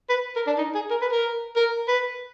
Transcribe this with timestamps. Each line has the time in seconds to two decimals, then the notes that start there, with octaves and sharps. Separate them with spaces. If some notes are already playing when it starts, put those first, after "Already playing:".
0.10 B4
0.36 A#4
0.47 D4
0.58 D#4
0.75 G#4
0.91 A#4
1.02 B4
1.12 A#4
1.56 A#4
1.88 B4